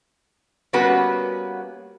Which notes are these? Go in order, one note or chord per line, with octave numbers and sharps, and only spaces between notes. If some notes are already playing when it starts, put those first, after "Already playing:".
G3 A#3 B3 C#4 F#4 B4